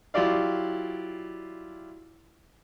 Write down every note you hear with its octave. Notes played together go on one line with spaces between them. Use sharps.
F#3 E4 F4 G4 D5 F5